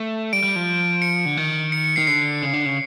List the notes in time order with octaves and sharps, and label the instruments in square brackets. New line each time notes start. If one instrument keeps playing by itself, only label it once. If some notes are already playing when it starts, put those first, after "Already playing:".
Already playing: [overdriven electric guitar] A3
[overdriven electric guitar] G3 [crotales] D7
[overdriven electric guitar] G3
F3
[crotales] C#7
[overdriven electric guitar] D3
D#3
[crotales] C#7
C#7
[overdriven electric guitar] D#3 [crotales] C7
[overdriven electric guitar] D3 [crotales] C7
[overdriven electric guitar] C#3
D3
C#3